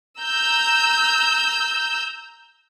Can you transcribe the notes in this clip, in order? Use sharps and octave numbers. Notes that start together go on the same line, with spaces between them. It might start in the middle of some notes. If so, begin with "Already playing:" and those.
A#5 E6 G6